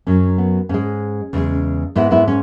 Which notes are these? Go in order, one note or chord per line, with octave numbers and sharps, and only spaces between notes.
F#2 F#3 C#4
B3
G#2 G#3 C#4
E2 C#3 G#3
G#2 G#3 B3 E4
B3 E4
C#4